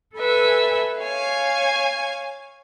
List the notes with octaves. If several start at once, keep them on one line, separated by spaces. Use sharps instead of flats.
A4 B4 E5 G#5
C#5 F5 G#5